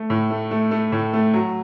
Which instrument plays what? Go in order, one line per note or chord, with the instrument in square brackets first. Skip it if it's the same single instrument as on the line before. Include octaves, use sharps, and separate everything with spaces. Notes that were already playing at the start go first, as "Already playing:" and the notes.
Already playing: [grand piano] A3
A2
A3
A3
A3
A2
A3
F#3